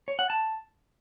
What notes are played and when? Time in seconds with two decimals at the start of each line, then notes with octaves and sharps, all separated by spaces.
0.08 C#5
0.19 F#5
0.30 A5